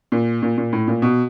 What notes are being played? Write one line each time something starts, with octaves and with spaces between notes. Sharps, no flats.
A#2
A#2
A#2
A2
A#2
B2